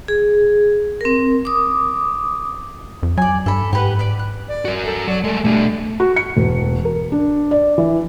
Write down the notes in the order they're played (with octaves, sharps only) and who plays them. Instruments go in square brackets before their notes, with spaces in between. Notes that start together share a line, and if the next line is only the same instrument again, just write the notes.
[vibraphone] G#4
C4 A#4
D6 D#6
[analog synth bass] F2
[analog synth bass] F#3 [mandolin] D5 G#5
[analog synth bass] G2 [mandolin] A4 B5
[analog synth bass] G#2 [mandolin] G4 B4 F#5
[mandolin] B4 D5
F#6
[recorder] D5
[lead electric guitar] F#4 A#4
[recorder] A4
[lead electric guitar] F#3 [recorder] D5
[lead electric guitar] G#3 A3 [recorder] A4
[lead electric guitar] B2 D4 [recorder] G3 [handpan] A3
[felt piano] F#4
C#7
E1
A#4
D4
D5
E3